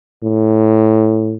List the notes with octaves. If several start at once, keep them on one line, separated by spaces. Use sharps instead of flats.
A2